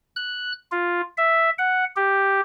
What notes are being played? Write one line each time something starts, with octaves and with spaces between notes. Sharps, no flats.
F#6
F4
E5
F#5
G4